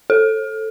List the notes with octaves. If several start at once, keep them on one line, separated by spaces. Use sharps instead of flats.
A4